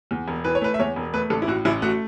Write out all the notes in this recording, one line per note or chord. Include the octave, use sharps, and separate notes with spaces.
E2
E1
E3 B4
C#5
A3 B4
E5
E2 C#5
E1
A3 B4
A1 A4
E4
A2 F#4
A1 E4
A3 F#4